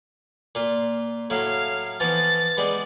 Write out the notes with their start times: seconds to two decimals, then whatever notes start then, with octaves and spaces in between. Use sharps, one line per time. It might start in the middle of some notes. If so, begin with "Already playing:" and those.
0.55 A#2 F4
1.30 A2 F#3 F5
2.00 E3 F3 B3 A6
2.57 G3 G#3 B3